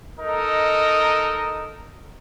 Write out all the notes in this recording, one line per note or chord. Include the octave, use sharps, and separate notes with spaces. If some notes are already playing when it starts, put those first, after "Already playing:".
D#4 A4 A#4 D#5